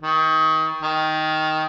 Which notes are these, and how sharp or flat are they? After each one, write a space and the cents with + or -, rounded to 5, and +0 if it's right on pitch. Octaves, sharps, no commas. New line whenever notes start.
D#3 +30
D#3 +5